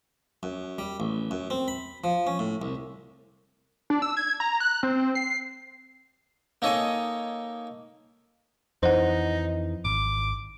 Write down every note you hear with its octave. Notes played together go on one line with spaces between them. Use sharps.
F#2
G3
A1
F#2
C4
B5
F3
C#4
A2
C2
D4
E6
G#6
A#5
F#6
C4
C7
A#3 D#4 A4 C#5 D#5 G#5
F2 E3 D#4 C5 F#5
G#1 D6